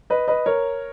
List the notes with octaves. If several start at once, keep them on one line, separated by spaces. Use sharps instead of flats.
B4 D#5
B4 D#5
A#4 C#5